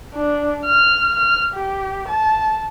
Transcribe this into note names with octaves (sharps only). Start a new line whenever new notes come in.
D4
F6
F6
G4
A5